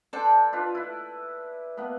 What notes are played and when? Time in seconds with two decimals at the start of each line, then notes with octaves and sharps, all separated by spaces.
0.13 A4 C5 D5 F#5 A5
0.53 D4 F4 B4
0.75 E4 B4
1.77 A#3 B3 B4